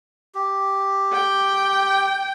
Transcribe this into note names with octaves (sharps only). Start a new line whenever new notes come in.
G4
G5